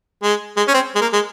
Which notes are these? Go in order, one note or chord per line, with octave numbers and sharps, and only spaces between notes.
G#3
G#3
C#4
C4
G#3
A#3
G#3